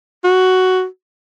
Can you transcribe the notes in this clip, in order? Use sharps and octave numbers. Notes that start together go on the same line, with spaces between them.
F#4